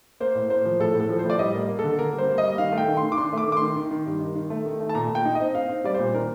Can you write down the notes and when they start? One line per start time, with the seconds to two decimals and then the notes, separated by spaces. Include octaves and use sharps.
0.20 A#3 C5
0.35 A2
0.50 A#3 C5
0.65 F3
0.79 A2 A4
0.95 A2
1.00 A4
1.09 F3
1.19 C5
1.25 A2 D5
1.39 G3 D#5
1.54 A#3
1.68 A#3
1.79 D3 A4
1.99 A#3 A#4
2.13 G3
2.18 C5
2.28 A#3
2.38 D#5
2.43 G3
2.58 D#3 F5
2.72 A3
2.78 G5
2.88 D#3
2.97 C6
3.03 D#3
3.12 D6
3.17 D4 C6
3.33 A3 D6
3.47 D#3
3.52 D6
3.57 C6
3.62 D#3
3.76 D#3
3.91 D#3
4.06 G2
4.20 D#4
4.35 D#3
4.50 A3
4.66 D#3
4.80 A3
4.89 A5
4.95 A#2 A#5
5.10 A#2
5.15 G5
5.25 D#4
5.35 C4 D#5
5.55 D#4 F5
5.69 C4
5.84 G3 D5
5.94 A#2 C5
6.14 D#3 A#4